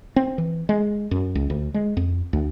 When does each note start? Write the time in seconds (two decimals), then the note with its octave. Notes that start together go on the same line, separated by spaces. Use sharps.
0.16 C4
0.38 E3
0.69 G#3
1.11 F#2
1.35 C#2
1.50 D2
1.74 G#3
1.97 F2
2.33 D2